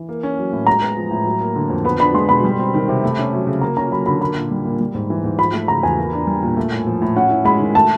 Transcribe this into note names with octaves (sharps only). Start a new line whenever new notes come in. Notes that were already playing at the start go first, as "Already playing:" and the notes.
Already playing: E3
A#3
C#4
F#3
A2
G#3 A#5
B3
F3
A2
F#3
A#3
D3
F2
B3 B5
D4 B5
G#3 C6
B2 B5
G3
C4
D#3
C3
A3
C#4
F#3
C#3
A#3 A#5
C#4 A#5
F#3 B5
D3 B5
A#3 B5
A#2
G3
A#2
G3
G#2
E3
G#2
F3 B5
A3
C#3 A#5
E2 G#5
A#3
D4
G3
A#2
A3
A2
F3
A2
C#4 F#5
E4
G#3 B5
D#3
A3 A5